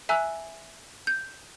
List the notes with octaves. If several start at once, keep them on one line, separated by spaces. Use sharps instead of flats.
E5 G#5 A#5 E6 F#6
G6